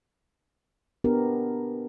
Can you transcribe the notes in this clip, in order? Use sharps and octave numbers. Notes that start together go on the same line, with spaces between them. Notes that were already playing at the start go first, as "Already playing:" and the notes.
B3 D4 G4 A#4